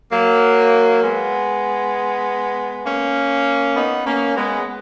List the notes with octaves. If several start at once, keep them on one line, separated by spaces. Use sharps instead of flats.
F#3 A#3
G#3 B3
A#3 C#4
B3 D#4
A#3 C#4
G#3 B3